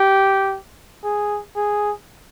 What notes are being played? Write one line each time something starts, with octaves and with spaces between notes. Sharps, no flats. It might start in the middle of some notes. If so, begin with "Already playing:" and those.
Already playing: G4
G#4
G#4